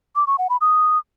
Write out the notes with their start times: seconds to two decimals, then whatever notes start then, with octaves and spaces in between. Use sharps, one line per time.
0.16 D6
0.27 C#6
0.38 F#5
0.50 B5
0.61 D#6